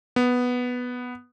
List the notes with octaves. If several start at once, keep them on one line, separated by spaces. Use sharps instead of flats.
B3